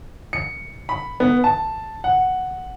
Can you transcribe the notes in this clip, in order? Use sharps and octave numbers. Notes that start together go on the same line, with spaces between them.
C#7
B5
B3
A5
F#5